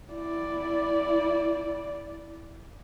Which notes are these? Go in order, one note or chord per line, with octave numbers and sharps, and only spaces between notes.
E4 D5